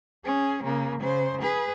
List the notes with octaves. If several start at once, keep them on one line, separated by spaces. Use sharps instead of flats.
C#4 G#4
C#3 A#3
C#3 C5
G#4 B4